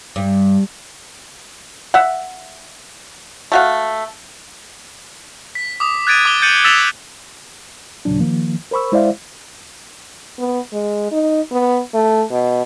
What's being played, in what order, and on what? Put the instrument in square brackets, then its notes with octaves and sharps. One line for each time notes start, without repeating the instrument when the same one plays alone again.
[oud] G2
[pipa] E5 F#5
A3 F#4 F5
[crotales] B6
D6 D#6
F#6 G#6 A6 D7 D#7
D6 D#6 G7
G6 A6 C#7 D#7 F#7
E6 A6 B6 E7 F7 G7
[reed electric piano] D#2 A#2 C#3 F#3 D4
D#3 F3 A#3
A#4 C5 B5 C#6 E6
G#3 E4 C5 D5 E5 F5
[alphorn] B3
G#3
D#4
B3
A3
B2